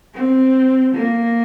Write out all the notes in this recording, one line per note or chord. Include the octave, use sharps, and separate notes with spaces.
C4
A#3